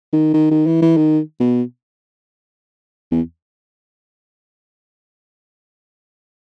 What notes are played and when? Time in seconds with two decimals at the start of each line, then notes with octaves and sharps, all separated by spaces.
0.13 D#3
0.34 D#3
0.51 D#3
0.67 E3
0.82 E3
0.97 D#3
1.40 B2
3.12 E2